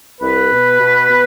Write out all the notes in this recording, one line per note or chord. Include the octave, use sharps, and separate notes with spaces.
C2 B4
B2
B2
B2